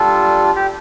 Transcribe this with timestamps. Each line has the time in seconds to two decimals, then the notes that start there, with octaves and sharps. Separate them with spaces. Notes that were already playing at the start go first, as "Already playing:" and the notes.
Already playing: G3 D4 F4 A4
0.55 G4